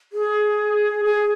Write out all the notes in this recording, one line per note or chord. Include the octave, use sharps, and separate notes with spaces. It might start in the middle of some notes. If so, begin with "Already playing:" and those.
G#4
G#4